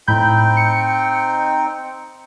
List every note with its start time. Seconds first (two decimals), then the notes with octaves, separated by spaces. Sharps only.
0.08 A2 C4 D#4 G5 B5 G6
0.57 C#7